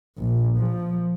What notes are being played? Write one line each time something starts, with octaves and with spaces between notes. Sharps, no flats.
A#1
F3